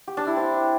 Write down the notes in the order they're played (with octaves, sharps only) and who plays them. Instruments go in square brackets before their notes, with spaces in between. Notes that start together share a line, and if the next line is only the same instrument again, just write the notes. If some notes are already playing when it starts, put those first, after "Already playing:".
[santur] G4
D4
E4
C4